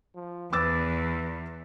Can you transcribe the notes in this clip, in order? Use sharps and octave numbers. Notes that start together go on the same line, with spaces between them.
F3
E2 B4 D6 E6 A6